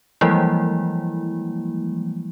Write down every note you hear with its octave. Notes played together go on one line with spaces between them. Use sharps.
E3 F3 G3 G#3 A#3 E4